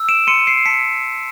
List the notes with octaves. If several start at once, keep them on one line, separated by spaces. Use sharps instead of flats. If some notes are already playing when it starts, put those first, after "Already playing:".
Already playing: E6
D7 E7
C6 C#7 D#7
C7 D7
A5 B6 C#7